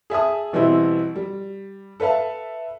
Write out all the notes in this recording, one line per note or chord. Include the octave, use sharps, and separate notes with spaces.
G#4 E5 A5 D#6
B2 E3 G3 C4 E4
G3
A4 B4 E5 F5 A5